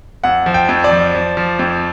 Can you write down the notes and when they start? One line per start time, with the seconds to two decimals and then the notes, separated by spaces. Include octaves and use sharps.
0.24 F2 F#5
0.46 F3
0.54 G5
0.69 F2
0.84 D5
0.91 F3
1.14 F3
1.37 F3
1.59 F2